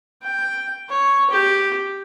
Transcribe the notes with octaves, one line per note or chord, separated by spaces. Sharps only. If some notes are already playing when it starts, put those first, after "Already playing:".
G5
C#5
G4